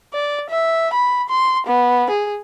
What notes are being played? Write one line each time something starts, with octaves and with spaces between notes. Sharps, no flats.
D5
E5
B5
C6
B3
G#4